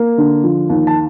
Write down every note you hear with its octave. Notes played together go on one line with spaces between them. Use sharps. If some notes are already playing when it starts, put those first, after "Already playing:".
Already playing: A#3
D3
F3
D#2
A5